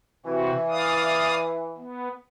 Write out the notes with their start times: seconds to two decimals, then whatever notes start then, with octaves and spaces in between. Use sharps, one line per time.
0.26 C3 E3 C4 F#4
0.70 D5 F5 D#6
1.78 B3